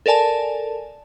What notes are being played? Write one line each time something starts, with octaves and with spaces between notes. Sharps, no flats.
A4 A#4 D5 G#5 A5